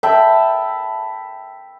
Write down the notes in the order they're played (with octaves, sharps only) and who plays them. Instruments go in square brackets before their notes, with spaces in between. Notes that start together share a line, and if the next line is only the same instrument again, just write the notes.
[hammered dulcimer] E5 G5 A5 B5